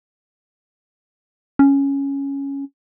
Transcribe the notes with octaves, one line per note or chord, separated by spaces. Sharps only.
C#4